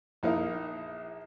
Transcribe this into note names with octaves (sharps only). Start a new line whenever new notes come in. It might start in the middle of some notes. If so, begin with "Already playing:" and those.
A#1 D#4 E4 A#4 F5